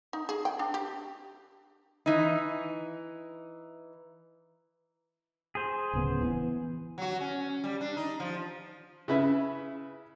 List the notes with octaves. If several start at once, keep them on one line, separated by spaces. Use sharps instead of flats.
D#4
G#4
G5
D4
G4
E3 D#4
G#4 C5
D1 C#3 B3
E3 B3
F#3 F#4
C#4
G3
D4
D#4
F3
C#3 E4 B4 E5